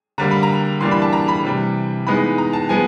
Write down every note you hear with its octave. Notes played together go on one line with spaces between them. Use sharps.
D3 G3 A#3 A#5
B5
A#5
E3 G3 A#3 D4 C6
B5
A5
A#5
B5
C3 E3 G3
E3 G#3 B3 D#4 B5
A#5
A5
F3 G#3 B3 G#5